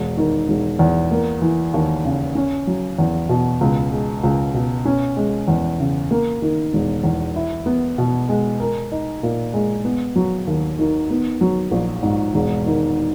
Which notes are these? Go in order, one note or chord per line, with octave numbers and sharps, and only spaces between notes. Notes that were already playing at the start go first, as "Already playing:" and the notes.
Already playing: E1
D#3
E1
E2
A#3
E3
D#2
C#3
C#4
F#3
E2
B2
C#2
G#3
C#2
B2
C#4
G#3
E2
C#3
A#3
D#3
E1
E2
E4
B3
B2
G#3
A#4
D#4
A#2
G#3
B3
F#3
D#2
D#3
B3
F#3
A#1
G#2
E1
D#3